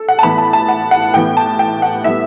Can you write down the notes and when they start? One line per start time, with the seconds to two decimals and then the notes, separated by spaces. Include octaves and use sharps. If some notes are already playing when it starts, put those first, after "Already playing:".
Already playing: A4
0.08 F#5
0.19 A5
0.23 A2 E3 B3 B5
0.38 A5
0.53 A5
0.68 F#5
0.91 F#5
1.14 A2 E3 B3 G5
1.37 A5
1.59 G5
1.82 F#5
2.04 A2 G3 B3 E5